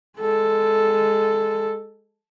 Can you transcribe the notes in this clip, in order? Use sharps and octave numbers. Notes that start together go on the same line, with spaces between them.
G#3 A4